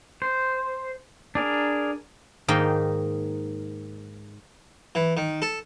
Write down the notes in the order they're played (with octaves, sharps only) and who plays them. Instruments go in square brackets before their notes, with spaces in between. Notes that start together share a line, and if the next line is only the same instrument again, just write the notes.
[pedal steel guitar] C5
D4 G#4 A#4
[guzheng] G#2 D#3 A#3 D#4 G5
[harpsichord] E3
D#3
A4